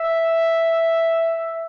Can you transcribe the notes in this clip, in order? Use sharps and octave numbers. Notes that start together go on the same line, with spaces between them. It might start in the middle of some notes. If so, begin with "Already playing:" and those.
Already playing: E5